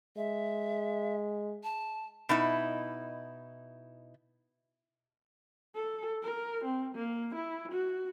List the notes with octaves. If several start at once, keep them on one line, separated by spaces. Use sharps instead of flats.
G#3 E5
A5
B2 D#4 E4
A4
A#4
C4
A#3
E4
F#4